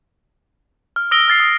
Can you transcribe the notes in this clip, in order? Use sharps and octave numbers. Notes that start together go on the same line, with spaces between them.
F6
D#6 E6 A#6 D7 G7
F6 A6 C7 G7
D#6